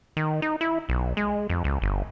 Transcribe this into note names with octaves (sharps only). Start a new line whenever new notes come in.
D#3
D#4
E4
B1
G#3
F2
C#2
G1